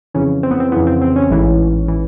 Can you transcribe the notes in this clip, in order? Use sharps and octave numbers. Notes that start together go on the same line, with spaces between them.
F2 C#3 E3 C#4
C4
B3
C4
F2 C#3 E3 B3
C4
C4
C#4
A1 G#2 E3
E3